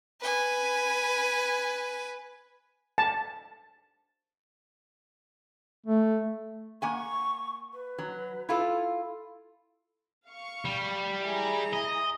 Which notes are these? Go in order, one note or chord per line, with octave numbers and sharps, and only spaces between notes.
B4 G#5
A5
A3
A#3 F#5 G#5 C#6
B4
F#3
E4 F4 A4
F5 C#6
G3
E4 G#4 A#5
D#5